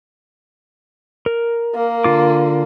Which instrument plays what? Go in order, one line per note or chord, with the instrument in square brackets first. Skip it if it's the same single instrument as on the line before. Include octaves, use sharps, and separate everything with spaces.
[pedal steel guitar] A#4
[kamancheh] A#3
[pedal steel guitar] D3 F4 D6